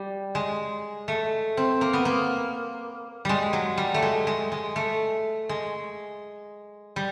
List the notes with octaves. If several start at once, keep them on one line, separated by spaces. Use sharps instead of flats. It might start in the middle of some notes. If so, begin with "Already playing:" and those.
Already playing: G3
G#3
A3
C4
A#3
B3
A#3
G3 G#3
F#3
G3
A3
G#3
G#3
G#3
A3
G#3
G3